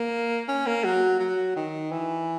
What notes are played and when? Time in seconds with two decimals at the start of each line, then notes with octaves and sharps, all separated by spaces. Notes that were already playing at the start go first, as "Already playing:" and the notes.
Already playing: A#3
0.48 C#4
0.66 A#3
0.84 F#3
1.20 F#3
1.56 D#3
1.92 E3